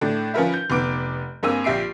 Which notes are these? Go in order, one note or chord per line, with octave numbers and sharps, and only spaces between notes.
A2 A3 D4
F3 C#4 F4 A#4 B4 E5
G6
F1 B3 D6 D7
G2 A#3 C4 G#4 G#5 E6
A#1 F3 G4 E5 C7 D7